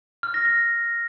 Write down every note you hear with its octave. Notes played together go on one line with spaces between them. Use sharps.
F6
A#6
A#6